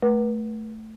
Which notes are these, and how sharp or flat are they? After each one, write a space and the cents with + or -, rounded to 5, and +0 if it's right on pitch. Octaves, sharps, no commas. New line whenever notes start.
A3 +0 B4 -35